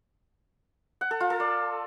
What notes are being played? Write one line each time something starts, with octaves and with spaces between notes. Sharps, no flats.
F#5
A4
F4
A4
D5